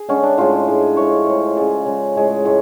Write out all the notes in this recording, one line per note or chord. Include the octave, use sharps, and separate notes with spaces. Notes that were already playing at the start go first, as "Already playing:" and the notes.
Already playing: G#4
D3 G#3 C#4
D4
A2 G#3 F4
A2 G#3
A2 F3 G#3 C#5
A2 F3 G#3
C#3 G#3 D5
C#3 G#3
A2 G#3
A2 G#3